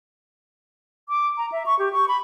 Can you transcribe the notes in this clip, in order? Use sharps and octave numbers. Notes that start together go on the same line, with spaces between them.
D6
A#5
E5
C#6
G4
C#6
B5